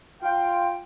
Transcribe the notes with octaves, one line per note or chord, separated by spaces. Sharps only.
F4 F5 G5